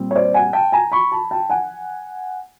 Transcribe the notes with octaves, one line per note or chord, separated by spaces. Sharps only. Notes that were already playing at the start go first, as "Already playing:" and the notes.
Already playing: A#2 G3 C4
C#5
C5 D5
F#5 G#5
G5 A5
G#5 A#5
B5 C#6
A5 B5
G5 A5
F#5 G#5